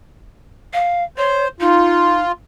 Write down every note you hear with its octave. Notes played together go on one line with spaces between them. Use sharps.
F5
C5 C#5
D#4 F4